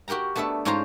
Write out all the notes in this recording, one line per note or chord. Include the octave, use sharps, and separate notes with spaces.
F#4 G4 A#4 G5 A#5
A3 B3 D4 A4 E5
G#2 C#4 D4 F4 C5 A#5